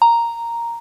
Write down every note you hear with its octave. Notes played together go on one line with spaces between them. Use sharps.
A#5